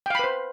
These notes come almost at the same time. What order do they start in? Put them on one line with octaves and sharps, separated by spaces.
G5 F5 B5 B4 C5